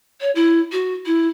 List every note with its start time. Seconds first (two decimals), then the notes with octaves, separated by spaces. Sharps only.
0.21 C#5
0.35 E4
0.72 F#4
1.06 E4